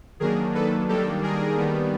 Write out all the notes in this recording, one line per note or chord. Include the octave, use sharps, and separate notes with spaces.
D#3 F#3 A#3 D4 G#4 A#4
A4 B4
D#3 G3 A#3 D4 G4 A4
G#4 A#4
D#3 G3 B3